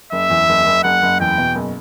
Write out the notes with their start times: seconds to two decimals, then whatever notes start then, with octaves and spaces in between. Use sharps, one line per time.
0.12 F#1 E5
0.30 E2
0.49 F#1
0.66 F#1
0.83 F#1 F#5
1.02 F#1
1.20 E2 G5
1.38 B2
1.55 F#1